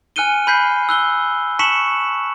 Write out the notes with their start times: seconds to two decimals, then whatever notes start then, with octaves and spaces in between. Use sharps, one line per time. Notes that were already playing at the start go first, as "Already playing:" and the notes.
0.16 G#5 F6 F#6 C#7 D#7 G7
0.47 B5 F#6 G6 B6 C7
0.89 E6 F#6 G7
1.59 A5 C#6 B6 C#7 E7 F#7